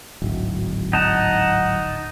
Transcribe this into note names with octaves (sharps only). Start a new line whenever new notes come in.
D1 G#1
D#4 F#5 A5